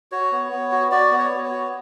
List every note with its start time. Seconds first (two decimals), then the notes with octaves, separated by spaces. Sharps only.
0.12 F#4 C#5
0.32 B3
0.52 B3
0.72 F#4
0.91 F#4 D5
1.12 B3
1.18 C#5
1.31 B3
1.45 C#5
1.51 F#4